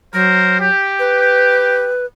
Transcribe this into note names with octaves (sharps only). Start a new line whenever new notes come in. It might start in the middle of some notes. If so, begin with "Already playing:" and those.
F#3 A#4 C5
G4
B4